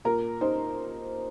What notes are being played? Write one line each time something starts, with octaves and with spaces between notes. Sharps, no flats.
A#2 A#4
D#4 C5